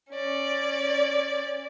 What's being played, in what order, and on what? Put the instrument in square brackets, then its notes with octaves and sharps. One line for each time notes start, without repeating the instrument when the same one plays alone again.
[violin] C#4 D5